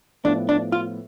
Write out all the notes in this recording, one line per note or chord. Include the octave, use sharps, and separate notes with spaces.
A2 F3 B3 D4
D4
F4